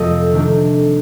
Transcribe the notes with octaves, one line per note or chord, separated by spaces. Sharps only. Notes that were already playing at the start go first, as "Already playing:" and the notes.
Already playing: F2 C3 A3 D#5
C3 D#3 A3 D4